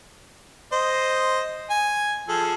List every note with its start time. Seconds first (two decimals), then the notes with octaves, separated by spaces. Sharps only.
0.72 C5 D#5
1.70 G#5
2.28 F3 G#4 A4